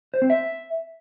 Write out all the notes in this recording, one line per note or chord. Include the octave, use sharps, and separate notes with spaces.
C5
C4
E5